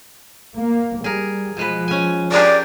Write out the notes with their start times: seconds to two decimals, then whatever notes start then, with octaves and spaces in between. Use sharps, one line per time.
0.57 A#3
1.04 G3 G#4 A#4
1.57 B2 F3 G#3 B4
1.88 C#4 G#5
2.32 G4 G#4 A#4 D5